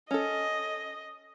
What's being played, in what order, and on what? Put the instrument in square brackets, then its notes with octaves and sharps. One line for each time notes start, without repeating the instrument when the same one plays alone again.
[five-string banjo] C#4 A4 [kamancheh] D#5